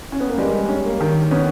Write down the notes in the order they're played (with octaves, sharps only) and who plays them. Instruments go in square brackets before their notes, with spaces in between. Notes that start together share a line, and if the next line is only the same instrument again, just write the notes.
[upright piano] C#4
B3
A#3
[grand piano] G3 [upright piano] G#3
[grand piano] C#4
[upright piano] A#3
[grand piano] D#3
[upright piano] B3 [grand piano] C#4